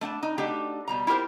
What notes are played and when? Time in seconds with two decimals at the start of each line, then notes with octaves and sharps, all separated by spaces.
0.01 A3 D4 G5 A5
0.23 D#4
0.38 A3 D4 D#4 F#4 G4
0.87 B2 G3 A#5
1.07 E4 F4 G4 A#4 C5